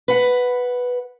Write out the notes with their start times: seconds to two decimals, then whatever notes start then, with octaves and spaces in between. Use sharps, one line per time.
0.08 B4 F#5